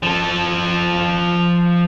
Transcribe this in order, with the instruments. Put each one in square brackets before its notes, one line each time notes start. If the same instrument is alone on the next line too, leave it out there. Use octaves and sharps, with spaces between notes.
[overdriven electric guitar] F3 A4